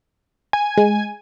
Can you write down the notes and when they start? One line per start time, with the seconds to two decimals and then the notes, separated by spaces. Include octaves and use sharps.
0.53 G#5
0.77 G#3